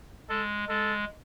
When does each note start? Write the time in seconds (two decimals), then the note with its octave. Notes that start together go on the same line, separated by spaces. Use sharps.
0.29 G#3 A4
0.69 G#3 A4